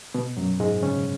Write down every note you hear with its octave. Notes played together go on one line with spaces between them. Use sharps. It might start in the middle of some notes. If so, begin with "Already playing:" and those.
B2 B3
F#2 F#3
G#2 G#3
C#3 C#4